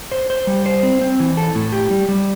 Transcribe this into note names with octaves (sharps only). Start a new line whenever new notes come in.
C5
C5
G3
C5
C4
C4
E3
A4
A2
G4
G3
G3